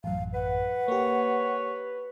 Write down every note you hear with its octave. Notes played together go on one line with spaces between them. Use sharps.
A1 F#2 F5
B4 F#5
A#3 G4 C#5